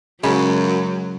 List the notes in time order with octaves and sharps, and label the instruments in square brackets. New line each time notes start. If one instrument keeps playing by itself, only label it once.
[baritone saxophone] F#2 [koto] C#3 [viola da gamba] F#3 [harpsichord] G#3